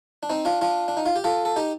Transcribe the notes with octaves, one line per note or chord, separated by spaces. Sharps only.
D4
C4 D#4
D4 F4
D4 F4
D4
D#4
F4
G4
F4 A4
A4
D#4 G4